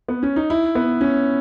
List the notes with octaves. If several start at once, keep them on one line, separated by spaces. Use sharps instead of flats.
B3
C#4
D#4
E4
B3
C#4